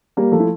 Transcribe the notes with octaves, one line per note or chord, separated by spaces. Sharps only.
G3 A#3
F3 A3
E4